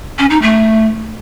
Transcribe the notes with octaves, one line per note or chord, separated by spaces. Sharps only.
C#4
D#4
A3